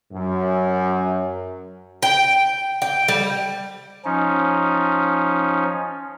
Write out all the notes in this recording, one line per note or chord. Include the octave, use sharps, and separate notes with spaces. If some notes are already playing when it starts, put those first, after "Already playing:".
F#2
G5
G5
G3
F3 C#4 D#4